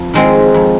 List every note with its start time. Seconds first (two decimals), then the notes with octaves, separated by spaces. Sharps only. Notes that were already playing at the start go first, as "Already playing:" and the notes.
Already playing: F2
0.14 D#3 G#3 C4
0.54 F2